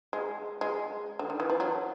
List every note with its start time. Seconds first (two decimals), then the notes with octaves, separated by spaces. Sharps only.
0.13 G#3
0.61 G#3
1.19 D3
1.30 D#3
1.40 E3
1.50 F3
1.60 F#3